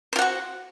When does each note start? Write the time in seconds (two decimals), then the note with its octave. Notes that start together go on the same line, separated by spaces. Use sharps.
0.13 C5
0.16 F4
0.19 F#5
0.22 F#4